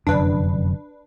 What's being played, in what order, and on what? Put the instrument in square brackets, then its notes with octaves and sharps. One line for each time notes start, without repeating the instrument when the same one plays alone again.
[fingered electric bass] F1 F#2 D3 [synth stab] D4 B4